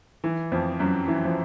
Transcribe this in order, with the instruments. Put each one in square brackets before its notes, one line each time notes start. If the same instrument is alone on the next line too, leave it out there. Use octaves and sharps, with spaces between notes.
[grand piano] E3
F2 F3
F#2 F#3
E3
F3